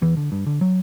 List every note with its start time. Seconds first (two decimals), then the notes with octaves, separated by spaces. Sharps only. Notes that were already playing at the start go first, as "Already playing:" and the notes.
0.02 E2 E3
0.17 D3
0.32 G2
0.47 D3
0.61 F#3